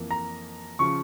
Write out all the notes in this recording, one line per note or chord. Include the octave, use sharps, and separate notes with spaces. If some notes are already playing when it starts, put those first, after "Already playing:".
Already playing: F2 E3 A#3
A#5
C#3 F3 C#6